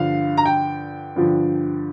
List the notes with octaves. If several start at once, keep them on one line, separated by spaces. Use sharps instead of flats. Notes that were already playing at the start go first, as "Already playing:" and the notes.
Already playing: G2 D3 F3 F5
A#5
G5
G2 D3 F3